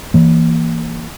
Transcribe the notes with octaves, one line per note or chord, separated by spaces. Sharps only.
E3 A#3